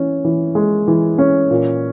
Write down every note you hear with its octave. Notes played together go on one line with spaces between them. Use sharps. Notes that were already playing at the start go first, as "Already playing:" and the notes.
Already playing: E3 C#4
E3
G#3
E3
C#4
A#2